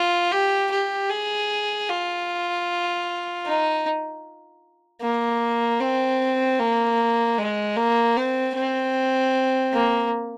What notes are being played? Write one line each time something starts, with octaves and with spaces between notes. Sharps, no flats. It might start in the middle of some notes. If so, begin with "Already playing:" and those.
Already playing: F4
G4
G4
G#4
F4
D#4
A#3
C4
A#3
G#3
A#3
C4
C4
A#3